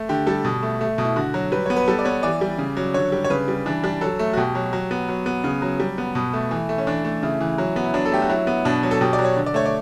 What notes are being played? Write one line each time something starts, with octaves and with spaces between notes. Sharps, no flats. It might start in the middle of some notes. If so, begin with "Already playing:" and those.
Already playing: A3
D3 G4
G3 A4
B2
A3
A3
B2
E4
D3 F#4
F#3
G3 B4
B3 C#5
B4
G3 A4
D5
B3 C#5
E3 D5
G3
C#3
F#3
D3 C#5
G3
C#5
C#3 B4
G3
E3 D4
G3 D4
F#3 A4
A3
F#4
B2 G4
F#3
F#3
B3
F#3
B3
C#3
F#3
G3
B3
B2
A3
E3
A3
C#4
E3 D4
A3
C#3 E4
E3
F#3
B3
E4
F#3 D4
A4
A3 G4
F#4
F#3 E4
B3
B2 D4
F#3
A4
B2 G4
D5
F#3
C#5
D3
D5
A3 C#5
D5